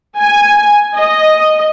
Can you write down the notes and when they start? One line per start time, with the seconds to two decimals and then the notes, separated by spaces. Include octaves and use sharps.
0.18 G#5
0.96 D#5